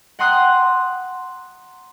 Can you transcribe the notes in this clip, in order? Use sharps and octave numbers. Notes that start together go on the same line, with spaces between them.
F#5 G5 A#5 C6 D#6 F#6